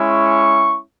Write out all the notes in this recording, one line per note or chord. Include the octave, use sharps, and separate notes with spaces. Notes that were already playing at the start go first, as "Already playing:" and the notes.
Already playing: G#3 C#4 E4
C#6